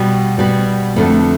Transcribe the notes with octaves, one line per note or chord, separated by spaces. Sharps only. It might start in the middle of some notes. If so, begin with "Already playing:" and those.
Already playing: B2 G3 B3
B2 G3 B3
F2 D3 A3 B3